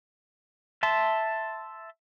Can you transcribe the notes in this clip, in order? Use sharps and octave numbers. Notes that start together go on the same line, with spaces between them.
E5 A5 C6